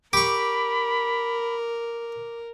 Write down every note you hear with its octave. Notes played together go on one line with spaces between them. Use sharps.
G4 A#4 B5 C#6 D6